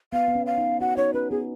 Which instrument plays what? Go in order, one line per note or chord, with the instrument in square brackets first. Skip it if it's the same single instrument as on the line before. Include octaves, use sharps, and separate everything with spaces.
[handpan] B3 [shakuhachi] F5
[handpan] B3
C#4
[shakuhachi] F5
[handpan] D#4
[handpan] F#4 [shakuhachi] F#5
[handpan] D#4 [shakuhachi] C#5
[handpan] C#4 [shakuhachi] B4
[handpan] B3 [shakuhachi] G#4